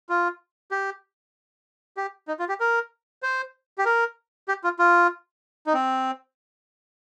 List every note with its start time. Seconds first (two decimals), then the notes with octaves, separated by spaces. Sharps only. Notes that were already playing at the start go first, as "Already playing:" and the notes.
0.09 F4
0.71 G4
1.97 G4
2.28 D#4
2.39 F4
2.49 G4
2.60 A#4
3.23 C5
3.78 G4
3.85 A#4
4.48 G4
4.64 F4
4.79 F4
5.67 D#4
5.74 C4